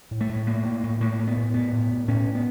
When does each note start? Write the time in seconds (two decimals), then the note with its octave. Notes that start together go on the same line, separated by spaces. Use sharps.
0.11 A2
0.21 A3
0.29 A2
0.46 A2 A#3
0.65 A2
0.83 A2
1.00 A2 A#3
1.19 A2
1.28 B3
1.36 A2
1.54 A2 B3
1.72 A2
1.91 A2
2.08 A2 C#4
2.26 A2
2.35 B3